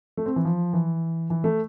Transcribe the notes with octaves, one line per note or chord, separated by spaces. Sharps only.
A3
C4
E3
F3
E3
E3
A3